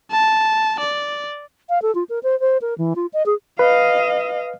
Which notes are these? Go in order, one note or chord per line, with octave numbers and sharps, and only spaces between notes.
A5
D5
F5
A4
F4
A#4
C5
C5
A#4
E3
F4
D#5
G#4
B4 D#5 F5